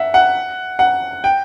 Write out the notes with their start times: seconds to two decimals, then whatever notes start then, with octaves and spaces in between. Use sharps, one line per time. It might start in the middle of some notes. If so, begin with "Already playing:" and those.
Already playing: E5 F#5
0.14 F#5
0.79 F#5
1.24 G5